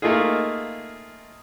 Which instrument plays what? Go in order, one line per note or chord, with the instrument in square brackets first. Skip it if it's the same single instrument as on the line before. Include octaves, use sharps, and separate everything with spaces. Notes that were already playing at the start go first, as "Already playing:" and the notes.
[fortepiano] A3 A#3 D#4 F4 G#4